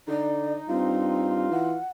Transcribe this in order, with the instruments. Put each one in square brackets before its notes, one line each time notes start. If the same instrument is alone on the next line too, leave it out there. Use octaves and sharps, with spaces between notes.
[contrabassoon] D3 [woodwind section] D#4 [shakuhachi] D5
[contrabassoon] G2 [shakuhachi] C4 [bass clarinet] F4
[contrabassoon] E3 [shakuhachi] F#5